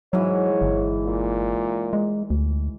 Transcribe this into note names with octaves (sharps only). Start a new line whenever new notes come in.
G#2 E3 F#3 C#5
G1
A#2
G#3
D2